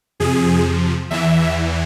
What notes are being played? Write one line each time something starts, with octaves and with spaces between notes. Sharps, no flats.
F2 C3 F3 G#4
E2 E3 E5